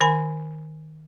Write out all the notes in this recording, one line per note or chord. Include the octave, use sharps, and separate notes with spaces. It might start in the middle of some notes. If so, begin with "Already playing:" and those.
D#3 A#4 G#5 B5